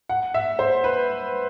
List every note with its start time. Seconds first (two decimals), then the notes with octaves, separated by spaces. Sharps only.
0.09 F#5
0.34 E5
0.59 C5
0.84 B4